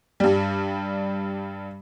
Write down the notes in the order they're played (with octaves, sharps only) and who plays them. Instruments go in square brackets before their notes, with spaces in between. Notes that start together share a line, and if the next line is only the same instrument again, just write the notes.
[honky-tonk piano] G2 G3